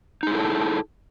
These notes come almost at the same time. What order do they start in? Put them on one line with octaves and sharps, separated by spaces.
D#4 G#4 E4 A4